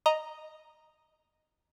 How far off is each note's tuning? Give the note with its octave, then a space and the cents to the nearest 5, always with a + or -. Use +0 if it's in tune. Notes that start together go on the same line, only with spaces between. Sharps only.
D#5 +0 A#5 +0